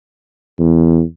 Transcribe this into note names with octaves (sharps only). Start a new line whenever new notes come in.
E2